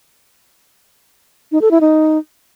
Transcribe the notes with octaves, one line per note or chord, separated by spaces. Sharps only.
D#4
A4
E4
D#4